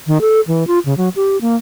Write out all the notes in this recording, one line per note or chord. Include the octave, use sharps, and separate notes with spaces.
D#3
A4
E3
F4
C#3
F#3
G4
A#3